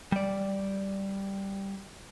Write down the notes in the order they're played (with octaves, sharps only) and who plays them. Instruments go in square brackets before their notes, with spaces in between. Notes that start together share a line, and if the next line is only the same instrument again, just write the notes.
[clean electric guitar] G3 D5